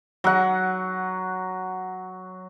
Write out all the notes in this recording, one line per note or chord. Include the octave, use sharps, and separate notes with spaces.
F#3 F#5